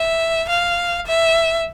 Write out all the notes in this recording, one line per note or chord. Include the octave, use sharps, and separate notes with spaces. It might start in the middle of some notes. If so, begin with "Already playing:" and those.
Already playing: E5
F5
E5